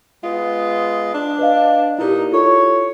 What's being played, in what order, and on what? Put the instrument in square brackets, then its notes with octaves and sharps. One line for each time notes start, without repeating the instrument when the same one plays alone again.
[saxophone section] G#3 B3 F4
D4
[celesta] B4 D#5 F5
[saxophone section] A#2 D#4 [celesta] E4 G4
[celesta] E4 F4 A4 [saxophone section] C#5